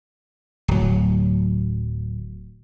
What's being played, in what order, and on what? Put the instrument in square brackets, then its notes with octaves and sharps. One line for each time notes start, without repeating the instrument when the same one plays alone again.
[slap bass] D1 F#3